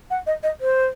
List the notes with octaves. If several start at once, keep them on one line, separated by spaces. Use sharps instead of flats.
F#5
D#5
D#5
C5